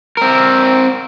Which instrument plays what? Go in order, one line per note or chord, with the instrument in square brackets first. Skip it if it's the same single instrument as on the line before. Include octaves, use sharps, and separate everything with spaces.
[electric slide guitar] C4 A#4